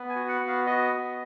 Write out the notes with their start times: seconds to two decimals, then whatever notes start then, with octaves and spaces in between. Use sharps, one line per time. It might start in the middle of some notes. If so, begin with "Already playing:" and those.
Already playing: B3
0.09 G#5
0.16 F#4
0.29 F#5
0.41 B3
0.47 F5
0.66 F#4 D#5
0.93 B3